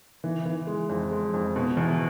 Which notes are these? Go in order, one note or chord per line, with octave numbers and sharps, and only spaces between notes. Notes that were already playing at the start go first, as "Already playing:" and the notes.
E3
E3
G#3
F2
G#3
F2
B2
E2